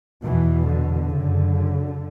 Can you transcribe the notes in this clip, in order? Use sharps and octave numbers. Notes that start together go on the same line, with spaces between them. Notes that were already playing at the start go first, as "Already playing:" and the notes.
E2 B2 E3
D3
F#2 C#3